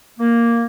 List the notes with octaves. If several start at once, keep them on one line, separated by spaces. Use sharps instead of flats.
A#3